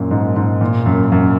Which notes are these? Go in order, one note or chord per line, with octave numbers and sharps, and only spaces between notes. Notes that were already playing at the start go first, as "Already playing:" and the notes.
Already playing: F#2 A#2
G#2
G#2
A#2
F#2
F#2